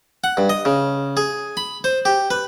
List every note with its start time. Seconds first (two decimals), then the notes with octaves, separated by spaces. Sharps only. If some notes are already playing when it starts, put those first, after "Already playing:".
0.24 F#5
0.37 G2
0.50 D#5
0.65 C#3
1.17 G#4
1.57 B5
1.84 C5
2.05 G4
2.31 B4